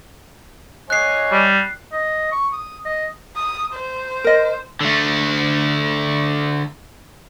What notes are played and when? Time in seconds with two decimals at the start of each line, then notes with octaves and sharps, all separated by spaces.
0.90 C#5 D#5 G#5 F#6 C7
1.32 G3
1.92 D#5
2.32 C#6
2.53 D#6
2.85 D#5
3.36 D#6
3.74 C5
4.24 A#4 D#5
4.81 D3 A3